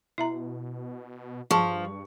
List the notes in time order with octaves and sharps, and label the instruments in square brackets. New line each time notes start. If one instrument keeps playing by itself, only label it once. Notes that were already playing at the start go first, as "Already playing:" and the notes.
[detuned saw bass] B2 [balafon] E4 E5 A#5
[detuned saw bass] G2 [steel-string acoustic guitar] F3 [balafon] G#4 A5 [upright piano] C#6